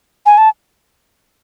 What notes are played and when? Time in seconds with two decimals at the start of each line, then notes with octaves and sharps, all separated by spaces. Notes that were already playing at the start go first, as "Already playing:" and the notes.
0.26 G#5
0.38 A5